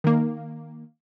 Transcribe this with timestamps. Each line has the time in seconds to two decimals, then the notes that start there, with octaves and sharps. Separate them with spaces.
0.04 D#3 A#3